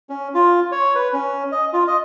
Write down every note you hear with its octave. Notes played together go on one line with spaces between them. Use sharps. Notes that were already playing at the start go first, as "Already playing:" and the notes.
C#4
F4
C#5
B4
C#4
D#5
F4
D#5